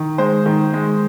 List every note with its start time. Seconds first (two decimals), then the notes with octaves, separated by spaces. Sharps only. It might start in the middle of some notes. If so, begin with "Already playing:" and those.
Already playing: D#3
0.18 G#3 C5
0.46 D#3
0.73 G#3